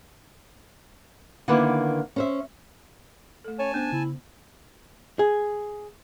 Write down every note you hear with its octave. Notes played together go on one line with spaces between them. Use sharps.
D3 D#3 A#3 B3 E4 B4
C#4 C5 E5
A3 A4
C#4 C#5 G#5 A5
B3 D4 C5
C#3 E4
G#4